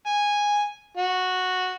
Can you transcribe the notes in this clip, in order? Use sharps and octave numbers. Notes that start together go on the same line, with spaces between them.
G#5
F#4